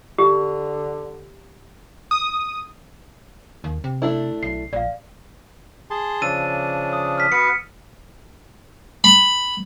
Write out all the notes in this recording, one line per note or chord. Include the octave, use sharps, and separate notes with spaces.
D3 G4
D#6
D#2
C3
A3 D4 E4
B1 C7
A#1 D5 F5
G#4 A5 C6
C#3 F3 D4 E6 A6 D#7
D#6
F6 B6
B3 F#4 B4 C#7
B5